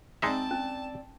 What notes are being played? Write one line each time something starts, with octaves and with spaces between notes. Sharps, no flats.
G#3 C4 D#4 D5 E5 G5 A5
C#4